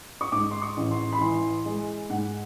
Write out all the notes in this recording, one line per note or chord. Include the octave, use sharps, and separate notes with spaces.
C#6
G#2 D6
C6
C#6
A1
C6
B5
E3 C6
G#3
G#2 F#5